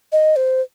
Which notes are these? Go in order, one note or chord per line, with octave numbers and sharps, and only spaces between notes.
D#5
C5